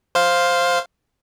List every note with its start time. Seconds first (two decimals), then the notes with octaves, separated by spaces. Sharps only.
0.15 C5 F5